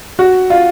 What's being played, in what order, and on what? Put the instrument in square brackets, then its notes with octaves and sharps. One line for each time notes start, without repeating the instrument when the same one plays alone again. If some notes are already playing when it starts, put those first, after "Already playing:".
[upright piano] F#4
F4